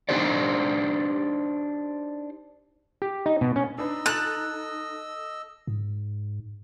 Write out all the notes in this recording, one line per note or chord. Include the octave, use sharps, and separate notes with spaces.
D4 D#4 G4 C5 D5
G4
D#4
B2
C#4
D4 D#4 B4 D#5 E6
A4 F#6 A6 E7
G#2